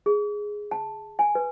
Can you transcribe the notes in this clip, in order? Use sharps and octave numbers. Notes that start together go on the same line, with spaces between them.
G#4
A5
G#5
B4